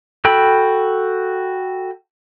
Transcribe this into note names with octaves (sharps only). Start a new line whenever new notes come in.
F#4 A4 G5 B5